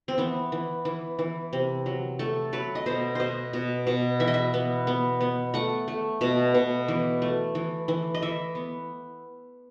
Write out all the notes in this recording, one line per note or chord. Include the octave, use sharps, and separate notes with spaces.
C4
E3 B3
E3
E3
E3
C3
F#3
A3 A4
F#3 B4
D#5
B2 C5
B2 C5 D#5
B2
B2
E3 E5
D#5
E5
B3
B3
B3
A3 F#5
A3
B2
B2
E3
A3
E3
E3
D#5
E3 E5
B3